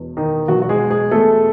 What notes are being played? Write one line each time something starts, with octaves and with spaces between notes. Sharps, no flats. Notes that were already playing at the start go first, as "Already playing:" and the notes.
Already playing: E1 E2 B2
D#3 D#4
E1 E2 B2 F#3 F#4
F#4
G#3 G#4
G#3 G#4
E1 E2 B2 A3 A4